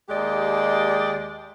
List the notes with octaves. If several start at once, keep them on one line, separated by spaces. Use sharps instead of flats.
D#2 G#3 G4 D5 D#5